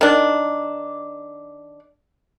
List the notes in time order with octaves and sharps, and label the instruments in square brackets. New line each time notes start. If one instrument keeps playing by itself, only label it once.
[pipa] D#3 D4